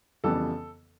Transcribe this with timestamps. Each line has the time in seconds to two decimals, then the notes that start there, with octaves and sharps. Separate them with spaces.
0.24 F2 C#3 E3 G3 B3 A4